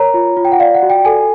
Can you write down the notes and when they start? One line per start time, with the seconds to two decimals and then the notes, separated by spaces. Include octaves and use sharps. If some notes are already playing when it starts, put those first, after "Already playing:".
Already playing: A#4 C#5 A#5
0.14 F4
0.37 F4
0.45 G5
0.52 F#5
0.60 D5 F5
0.75 F#5
0.83 F#4
0.90 G5
1.05 A4 G#5